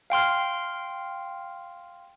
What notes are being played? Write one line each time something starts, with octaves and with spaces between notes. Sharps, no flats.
F5 G5 C6 F6